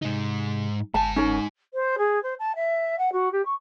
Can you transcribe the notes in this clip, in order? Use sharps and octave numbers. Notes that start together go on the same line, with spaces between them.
G#2 C3 D#4
G1 G#2 G#5 A5
C#4 D#4 A#4
C5
G#4
C5
A5
E5
F#5
F#4
G4
C#6